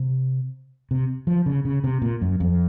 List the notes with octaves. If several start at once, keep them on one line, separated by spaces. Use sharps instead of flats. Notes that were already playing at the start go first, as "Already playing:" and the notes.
Already playing: C3
C3
F3
C#3
C#3
C3
A#2
F#2
F2